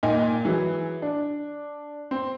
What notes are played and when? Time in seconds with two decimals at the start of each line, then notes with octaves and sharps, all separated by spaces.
0.03 A#2 D#4 G5 G#5
0.45 E3 F#3 G#4
1.02 D4
2.11 C4